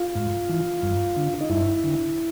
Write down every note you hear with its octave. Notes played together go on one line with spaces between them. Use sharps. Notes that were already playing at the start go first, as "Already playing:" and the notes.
Already playing: F4
G#2
E3
G2
D3
D#4
G2 E4
D3